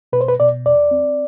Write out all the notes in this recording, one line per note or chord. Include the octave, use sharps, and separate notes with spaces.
B2 B4
C5
B4
B2 D5
E2 D5
C4